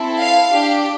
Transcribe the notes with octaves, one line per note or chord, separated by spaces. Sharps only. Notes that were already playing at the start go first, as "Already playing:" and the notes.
Already playing: C4 E4 A4
F5
D4 G4